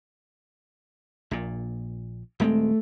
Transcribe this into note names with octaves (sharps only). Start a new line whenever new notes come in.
A#1 A#2
D#1 G#3 A3 C4